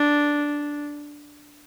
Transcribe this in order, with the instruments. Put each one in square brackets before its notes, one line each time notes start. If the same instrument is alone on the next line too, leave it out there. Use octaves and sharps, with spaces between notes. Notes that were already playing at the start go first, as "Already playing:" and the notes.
Already playing: [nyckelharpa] D4